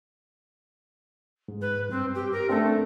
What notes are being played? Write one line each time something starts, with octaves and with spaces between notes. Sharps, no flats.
G#2
B4
G2 C4
G4
A#4
A3 C4 D4 A4